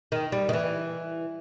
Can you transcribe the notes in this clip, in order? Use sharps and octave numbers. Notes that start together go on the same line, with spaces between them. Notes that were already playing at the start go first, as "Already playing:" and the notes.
D#3
G3
D#3
E3